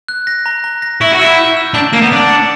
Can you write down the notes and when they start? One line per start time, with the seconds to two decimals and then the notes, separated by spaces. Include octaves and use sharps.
0.08 F#6
0.27 A#6
0.46 A#5
0.64 A#5
0.82 A#6
1.01 E4 C#6
1.11 F#4
1.19 E4 E6
1.38 G6
1.57 E6
1.74 D4 G6
1.93 A#3 E7
2.02 B3
2.11 D4 E7
2.30 C#7